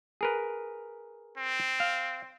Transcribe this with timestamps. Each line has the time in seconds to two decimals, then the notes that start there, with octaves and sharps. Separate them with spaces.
0.21 G#4 A#4 B4
1.37 C4
1.80 F5